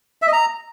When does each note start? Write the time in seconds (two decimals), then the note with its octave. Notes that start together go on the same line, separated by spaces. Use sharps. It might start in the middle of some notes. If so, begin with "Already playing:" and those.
0.22 E5
0.27 D#5
0.33 A#5